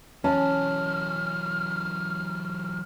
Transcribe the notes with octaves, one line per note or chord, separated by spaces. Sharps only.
E3 F#3 C#4 A5 F6